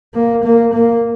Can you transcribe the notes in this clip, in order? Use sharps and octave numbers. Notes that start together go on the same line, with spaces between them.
A#3
A#3
A#3